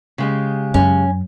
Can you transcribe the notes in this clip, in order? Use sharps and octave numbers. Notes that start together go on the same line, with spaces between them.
C#3 G#3 G4
F#2 C#4